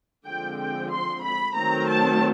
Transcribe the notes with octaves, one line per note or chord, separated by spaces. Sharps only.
D3 F3 G#3 C4 G5
G5
C6
B5
D#3 F#3 A3 C4 A#5
A5